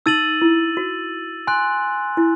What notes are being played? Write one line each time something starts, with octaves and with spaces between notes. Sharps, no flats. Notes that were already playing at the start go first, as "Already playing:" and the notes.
D#4 E6 A6 D#7 F#7
E4
F#4
G#5 C6 F#6
E4